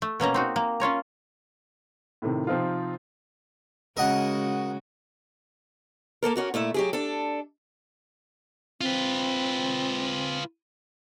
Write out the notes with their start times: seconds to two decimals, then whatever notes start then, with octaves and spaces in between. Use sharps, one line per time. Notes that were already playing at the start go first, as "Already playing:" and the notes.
0.02 A3
0.20 B2 A#3 C#4 A#5
0.34 C4 D#4 F#4
0.56 A#3
0.80 C#4 F4 C#5 A#5
2.22 A2 C3 D#3
2.47 C3 F3 C4 D#4 F4
3.97 C#3 G#3 F#4 A#4 D#5 F#5
6.23 A#3 B3 A4 A#4
6.36 C#4 F#4 A#4
6.54 A#2 A3 E4 E5
6.74 F#3 G4 G#4
6.93 D4 A4
8.81 C4 F4 B4